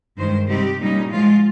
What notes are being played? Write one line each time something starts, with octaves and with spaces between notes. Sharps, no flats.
G2 D#3 G#3 C5
C3 G3 C4 D#4 G4
A#2 G3 C#4 D#4
G#2 F3 G#3 F4